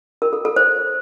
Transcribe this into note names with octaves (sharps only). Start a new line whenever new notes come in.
A#4
A4
A4
C5